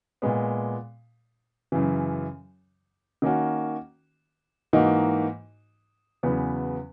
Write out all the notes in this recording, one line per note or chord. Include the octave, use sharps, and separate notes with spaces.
A#2 G#3 B3
F#2 C#3 E3
D#3 A#3 C#4 F#4
G#2 E3 A#3 D#4 F#4
E2 C#3 F#3 B3